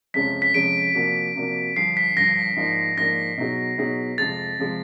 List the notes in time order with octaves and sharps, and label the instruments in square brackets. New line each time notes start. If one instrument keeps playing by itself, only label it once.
[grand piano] F2 C3 F3 G#3 C#4 [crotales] B6
[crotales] B6
[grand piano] F2 C3 F3 G#3 C#4 [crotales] D7
[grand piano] C3 F3 A#3 D4 F#4
C3 F3 A#3 D4 F#4
[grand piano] G2 D3 F3 [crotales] C7
[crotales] B6
[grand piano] G2 D3 F3 [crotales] A#6
[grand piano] G#2 F3 A#3 D4
[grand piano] G#2 F3 A#3 D4 [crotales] A#6
[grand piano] B2 F#3 B3 D#4 G#4
B2 F#3 B3 D#4 G#4
[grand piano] F2 C3 F3 G#3 [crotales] A6
[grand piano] C3 F3 G#3